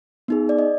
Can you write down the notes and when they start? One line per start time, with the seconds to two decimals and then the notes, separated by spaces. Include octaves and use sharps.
0.28 B3 D#4 G#4
0.49 D5
0.58 D#5